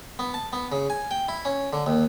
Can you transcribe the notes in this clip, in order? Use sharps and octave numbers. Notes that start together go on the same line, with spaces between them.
B3
A5
B3
C#3
G#5
G5
E4
C#4
D3
D#2